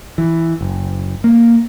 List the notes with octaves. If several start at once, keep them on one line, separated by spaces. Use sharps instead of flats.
E3
F#1
A#3